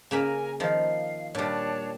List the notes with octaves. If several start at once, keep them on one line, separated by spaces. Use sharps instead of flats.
C#3 A#3 A#4 G#5 B5
D#3 F3 F5
A#2 G3 D4 C#5 A5